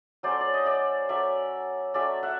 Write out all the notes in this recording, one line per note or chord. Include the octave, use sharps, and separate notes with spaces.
F#3 A3 C#4 C5 D5
D5
D#5
D5 E5
F#3 A3 C#4 D5 E5
F#3 A3 C#4 D5 E5
E5 F#5